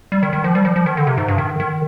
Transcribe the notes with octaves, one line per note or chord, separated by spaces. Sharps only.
G3
D#3
D#3
F3
G3
F3
F3
D#3
D3
C3
G#2
G2
D#3
D#3